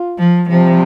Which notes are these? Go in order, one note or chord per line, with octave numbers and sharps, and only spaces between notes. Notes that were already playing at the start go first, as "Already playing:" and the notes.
Already playing: F4
F3
C3 F3 G3 C4